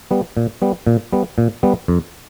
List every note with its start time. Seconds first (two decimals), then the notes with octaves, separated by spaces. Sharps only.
0.11 G3 B3
0.37 A#2
0.62 G3 B3
0.87 A#2
1.13 G3 B3
1.38 A#2
1.63 G3 B3
1.88 F2